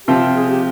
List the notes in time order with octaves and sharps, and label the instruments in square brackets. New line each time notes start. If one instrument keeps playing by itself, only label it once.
[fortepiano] C3 F3 C4 F4 [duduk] G4
[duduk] G#4
G4